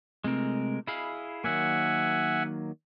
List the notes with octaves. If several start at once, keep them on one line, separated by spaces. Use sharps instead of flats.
C3 G#3 A3 C4 A#4
E4 G#4 D#5 F5 B5
D#3 F#3 A#3 E5 F#5 G#5